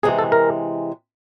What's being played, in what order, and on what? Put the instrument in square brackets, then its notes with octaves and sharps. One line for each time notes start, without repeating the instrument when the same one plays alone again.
[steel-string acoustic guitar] C3 E3 G#3 [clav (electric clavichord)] G#4
[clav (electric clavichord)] A4
A#4